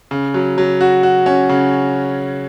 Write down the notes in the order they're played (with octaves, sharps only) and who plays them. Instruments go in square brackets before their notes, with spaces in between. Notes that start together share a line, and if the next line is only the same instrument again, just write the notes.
[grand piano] C#3
F#3
F#3
F#4
F#4
C#4
C#3